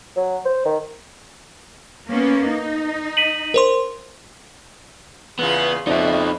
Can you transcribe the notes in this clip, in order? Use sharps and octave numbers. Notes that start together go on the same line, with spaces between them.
F#3
C5
D#3
A#3 B3 C#4
D#4
B6 D#7 F#7
A#4 C5 C6
E2 C#3 B3 F4
F2 B2 D#4 C#5 D5 E5